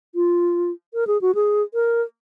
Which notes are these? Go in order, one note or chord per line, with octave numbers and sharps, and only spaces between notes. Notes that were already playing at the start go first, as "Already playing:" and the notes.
F4
A#4
G#4
F#4
G#4
A#4